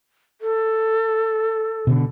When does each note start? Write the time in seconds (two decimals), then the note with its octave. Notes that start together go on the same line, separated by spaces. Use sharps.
0.41 A4
1.87 B2 D3